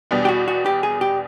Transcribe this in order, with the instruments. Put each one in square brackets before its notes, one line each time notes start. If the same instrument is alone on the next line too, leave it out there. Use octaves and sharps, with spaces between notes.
[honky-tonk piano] E2 B2 G3 B3 D4
[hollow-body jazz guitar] G4
F#4
F#4
G4
G#4
G4